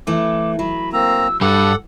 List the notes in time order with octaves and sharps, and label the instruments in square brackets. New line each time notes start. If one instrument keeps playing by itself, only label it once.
[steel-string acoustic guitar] E3 A3 [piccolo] D6
[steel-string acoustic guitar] F#3 [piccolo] B5
[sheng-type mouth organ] A#3 C4 A#5 [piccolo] E6
[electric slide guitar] G2 G3 [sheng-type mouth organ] A4 F#5 [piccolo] D6